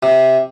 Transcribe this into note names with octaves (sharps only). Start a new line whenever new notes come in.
C3